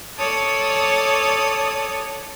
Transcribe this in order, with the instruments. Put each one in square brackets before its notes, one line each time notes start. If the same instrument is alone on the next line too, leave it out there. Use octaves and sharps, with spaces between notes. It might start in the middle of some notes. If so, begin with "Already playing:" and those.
[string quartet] A4 C#5 D5 A5 D#6